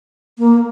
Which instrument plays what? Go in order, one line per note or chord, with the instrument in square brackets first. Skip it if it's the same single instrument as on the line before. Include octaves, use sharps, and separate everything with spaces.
[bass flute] A#3